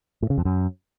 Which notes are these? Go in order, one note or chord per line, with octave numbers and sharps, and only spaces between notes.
A2
C#3
F2
F#2